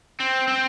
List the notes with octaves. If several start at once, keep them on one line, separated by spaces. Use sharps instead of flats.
C4
C4